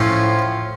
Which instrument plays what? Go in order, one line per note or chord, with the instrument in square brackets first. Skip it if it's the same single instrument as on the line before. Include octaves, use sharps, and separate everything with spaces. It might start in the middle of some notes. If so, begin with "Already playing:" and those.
Already playing: [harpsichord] A2 F3 C#4 F4